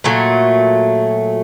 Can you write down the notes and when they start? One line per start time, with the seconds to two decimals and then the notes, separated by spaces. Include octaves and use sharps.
0.04 A#2 F#3 A3